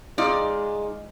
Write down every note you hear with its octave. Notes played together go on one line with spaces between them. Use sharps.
G#3 D#4 F4 D5